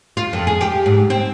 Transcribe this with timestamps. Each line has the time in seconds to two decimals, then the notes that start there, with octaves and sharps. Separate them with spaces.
0.17 F4
0.33 F2
0.47 G#4
0.61 G4
0.86 G#2
1.10 C4